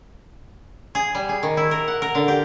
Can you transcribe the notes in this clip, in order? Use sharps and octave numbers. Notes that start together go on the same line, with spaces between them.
G#4
G3
G#4
D#3
E4
A#4
F#5
A#4
D3
G4